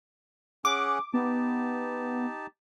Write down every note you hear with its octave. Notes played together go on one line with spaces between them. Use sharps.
C#4 G#4 F#5 D6
B3 D#4 G4 A5